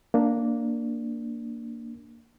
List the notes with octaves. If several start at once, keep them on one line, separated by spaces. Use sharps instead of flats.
A#3 D4